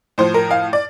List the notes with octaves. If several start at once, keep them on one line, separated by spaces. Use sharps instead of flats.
A2 F3 C5
A#4
F5
D5